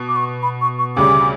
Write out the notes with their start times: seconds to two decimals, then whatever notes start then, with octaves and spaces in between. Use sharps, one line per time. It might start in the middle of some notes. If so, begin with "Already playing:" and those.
Already playing: B2
0.08 D6
0.16 C#6
0.42 B5
0.61 C#6
0.79 C#6
0.96 D2 C#3 G3 D6